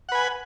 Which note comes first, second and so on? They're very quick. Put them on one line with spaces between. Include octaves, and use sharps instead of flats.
F#5 B4 G#5